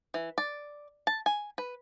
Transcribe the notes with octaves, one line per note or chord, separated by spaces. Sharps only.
E3
D5
A5
G#5
B4